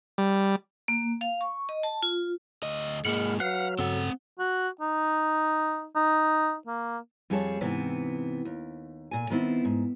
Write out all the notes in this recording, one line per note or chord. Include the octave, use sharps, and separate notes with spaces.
G3
A#3
F5
C#6
D#5
A5
F4
D2 D#5
G#2 G#3 A#3 F#5 B5 F6
F#3 B4 F5 F#5 F6
G2 C#3 C4 A4 F#5
F#4
D#4
D#4
A#3
F2 G3 G4 G#4 C#5 A5
G#2 C3 E3 B3 C4
D#2
A#2 G#5
D#3 B3 C4 E4
G#2